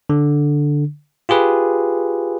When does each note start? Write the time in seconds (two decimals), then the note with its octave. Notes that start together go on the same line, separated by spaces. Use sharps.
0.09 D3
1.29 F4 G4 G#4 B4